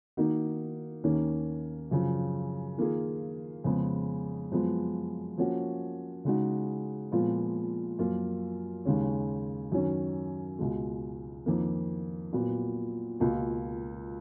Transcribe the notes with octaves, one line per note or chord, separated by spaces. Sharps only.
D#3 A#3 D#4 F#4
D#2 D#3 A#3 C#4
F#2 C#3 F3
D#3 A#3 F4 G#4
F2 C#3 G#3 B3
F#2 F3 G#3 B3
F3 A#3 C#4 F#4
C#3 G#3 D#4 F#4
A#2 F3 G#3 B3 F4
F#2 F3 A#3 F4
D#2 C#3 G#3 C#4
F#2 D#3 F#3 C#4
C#2 B2 G#3
F2 D#3 A#3
A#2 F#3 B3
C#2 B2 A#3 F4